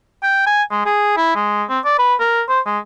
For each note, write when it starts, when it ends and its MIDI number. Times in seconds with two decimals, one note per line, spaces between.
0.23 0.45 79
0.47 0.63 80
0.71 0.83 56
0.86 1.15 68
1.17 1.34 64
1.36 1.63 56
1.69 1.79 60
1.85 1.94 74
1.99 2.15 71
2.20 2.42 70
2.48 2.60 72
2.66 2.78 56